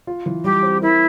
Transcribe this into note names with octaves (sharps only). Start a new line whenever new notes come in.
F4
E3
G3 G4
C4
E4 A#4